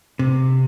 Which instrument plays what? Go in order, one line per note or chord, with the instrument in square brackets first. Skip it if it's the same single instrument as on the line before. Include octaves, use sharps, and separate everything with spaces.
[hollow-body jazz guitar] C3